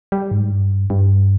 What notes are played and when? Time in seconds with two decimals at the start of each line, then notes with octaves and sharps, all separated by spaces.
0.12 G3
0.31 G#2
0.51 G2
0.90 G2